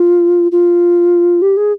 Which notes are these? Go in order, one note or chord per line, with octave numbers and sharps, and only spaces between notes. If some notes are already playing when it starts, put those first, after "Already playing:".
Already playing: F4
F4
G4
G#4